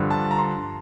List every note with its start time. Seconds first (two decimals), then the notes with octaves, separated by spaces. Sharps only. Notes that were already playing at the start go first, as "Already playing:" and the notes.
Already playing: G2 D3 F3
0.10 A5
0.31 A#5
0.39 C6